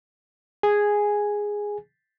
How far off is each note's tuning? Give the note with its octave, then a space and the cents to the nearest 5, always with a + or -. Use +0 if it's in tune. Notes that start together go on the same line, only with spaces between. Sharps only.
G#4 -5 G#5 +0